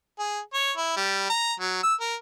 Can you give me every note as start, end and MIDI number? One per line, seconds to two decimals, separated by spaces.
0.19 0.40 68
0.54 0.71 73
0.77 0.95 64
0.97 1.25 55
1.30 1.53 82
1.60 1.78 54
1.83 1.94 88
2.01 2.15 70